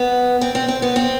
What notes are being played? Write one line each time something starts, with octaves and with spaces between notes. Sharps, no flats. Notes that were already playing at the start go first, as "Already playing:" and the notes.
Already playing: B3
C4
C4
C4
B3
C4